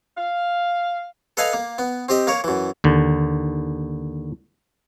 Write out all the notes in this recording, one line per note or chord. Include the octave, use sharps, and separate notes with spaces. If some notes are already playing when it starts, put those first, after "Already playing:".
F5
A4 B4 D#5 F5 G#5 A#5
A#3
B3
C4 G4 D#5
A#3 A#4 C#5
F#2 E3
D#2 D3